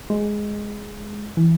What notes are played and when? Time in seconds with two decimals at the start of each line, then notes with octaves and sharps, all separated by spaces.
0.10 G#3
1.37 E3